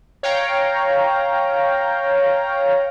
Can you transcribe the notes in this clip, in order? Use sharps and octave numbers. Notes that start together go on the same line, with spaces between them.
C#5 F5 G5 A#5